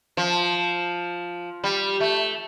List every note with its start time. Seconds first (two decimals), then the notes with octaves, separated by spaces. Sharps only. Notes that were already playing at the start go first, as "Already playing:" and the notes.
0.17 F3
1.64 G3
2.00 A3